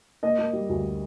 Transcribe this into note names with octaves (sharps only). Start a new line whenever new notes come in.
A#3 D#5
A#3
G3
D2